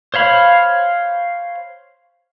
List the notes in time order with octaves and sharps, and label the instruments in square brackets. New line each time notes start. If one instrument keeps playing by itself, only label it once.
[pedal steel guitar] C5 C#5 F5 B5